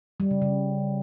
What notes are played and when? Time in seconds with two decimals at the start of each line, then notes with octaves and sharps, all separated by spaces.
0.20 G3
0.31 C#3
0.42 C#3